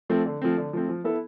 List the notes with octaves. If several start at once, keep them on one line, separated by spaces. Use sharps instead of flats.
F3 A3 C4
D3
F3 A3 C4
D3
F3 A3 C4
F3
B3 E4 A4